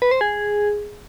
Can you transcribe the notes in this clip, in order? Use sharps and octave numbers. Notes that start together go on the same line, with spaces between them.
B4
C5
G#4